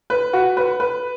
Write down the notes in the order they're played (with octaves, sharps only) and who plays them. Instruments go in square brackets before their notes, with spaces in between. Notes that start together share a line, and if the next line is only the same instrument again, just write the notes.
[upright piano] B4
F#4
B4
B4